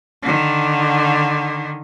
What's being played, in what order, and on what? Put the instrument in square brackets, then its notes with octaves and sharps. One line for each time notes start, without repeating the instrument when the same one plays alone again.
[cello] D3 D#3